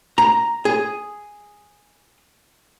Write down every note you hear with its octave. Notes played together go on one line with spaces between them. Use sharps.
A#5
G#4